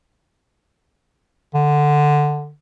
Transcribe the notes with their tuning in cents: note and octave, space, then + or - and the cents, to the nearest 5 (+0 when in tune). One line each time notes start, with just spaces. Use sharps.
D3 +10